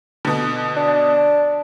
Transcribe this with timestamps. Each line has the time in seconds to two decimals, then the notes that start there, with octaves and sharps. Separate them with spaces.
0.25 B2 D3
0.76 D4